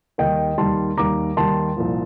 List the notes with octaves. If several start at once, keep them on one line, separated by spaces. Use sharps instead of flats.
D#2 D#3 G3 D#5 G5
D#2 D#3 G3 A5 C6
D#2 D#3 G3 A#5 D6
D#2 D#3 G3 A5 C6
C2 A#2 F3